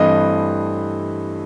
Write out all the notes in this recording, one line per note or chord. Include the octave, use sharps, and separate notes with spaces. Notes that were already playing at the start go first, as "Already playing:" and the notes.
Already playing: G2 E3 A3 C4 D#5